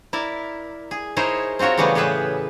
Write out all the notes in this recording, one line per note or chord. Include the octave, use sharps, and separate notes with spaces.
E4 A#4 D5
G#4
D#4 E4 G#4 A#4 C5 C#5
C4 F4 F#4 A#4 C#5
C#3 E3 G3 A3 B3 B4
A2 G4 G#4 B4 E5